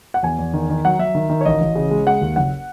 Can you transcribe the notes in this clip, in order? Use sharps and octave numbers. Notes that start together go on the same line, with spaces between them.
F#5
E2 G#5
E2
D#3
D#3
F#3 F#5
F#3 E5
D#3
D#3
C#5
A1 D#5
A1
C#3
G#3
G#3 F#5
D#2
F#1 F#5